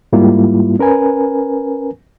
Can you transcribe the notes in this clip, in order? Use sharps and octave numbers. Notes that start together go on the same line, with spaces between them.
G#2 G3 A#3 E4 F4
C#4 A#4 B4 G#5